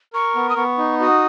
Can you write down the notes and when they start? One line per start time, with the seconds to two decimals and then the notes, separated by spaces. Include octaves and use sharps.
0.13 A#4 C#6
0.35 B3
0.49 D#6
0.57 B3 C#6
0.78 D#4
1.00 F#4 D#6